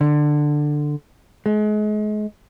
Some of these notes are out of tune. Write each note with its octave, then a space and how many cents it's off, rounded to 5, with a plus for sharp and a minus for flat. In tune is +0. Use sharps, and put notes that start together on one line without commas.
D3 +15
G#3 +35